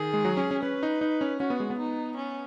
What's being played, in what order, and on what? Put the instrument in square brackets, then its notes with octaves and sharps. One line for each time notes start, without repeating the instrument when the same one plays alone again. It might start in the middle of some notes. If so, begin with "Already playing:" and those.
Already playing: [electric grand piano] D#3 [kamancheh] G#4
[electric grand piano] G#3
F#3
C#4
C#4
[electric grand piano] C#4 [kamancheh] B4
[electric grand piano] D#4
D#4
C#4
[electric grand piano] C#4 [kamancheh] F#4
[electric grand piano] B3
G#3
B3
[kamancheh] D#4
C#4